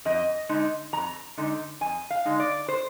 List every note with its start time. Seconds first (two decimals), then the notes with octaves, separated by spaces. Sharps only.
0.05 F2 D#5
0.49 D3 G#3 D#4
0.93 F2 A#5
1.37 D3 G#3 D#4
1.81 F2 G#5
2.10 F5
2.25 D3 G#3 D#4
2.40 D5
2.68 C5